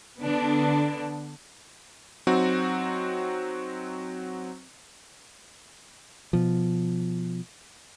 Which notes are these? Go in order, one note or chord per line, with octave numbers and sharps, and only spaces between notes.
D3 B3 D4
F#3 C4 D#4 F#4
B2 F3